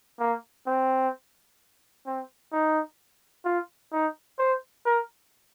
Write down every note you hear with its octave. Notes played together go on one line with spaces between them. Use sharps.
A#3
C4
C4
D#4
F4
D#4
C5
A#4